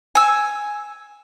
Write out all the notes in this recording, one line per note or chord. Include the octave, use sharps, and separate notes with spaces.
G#5 E6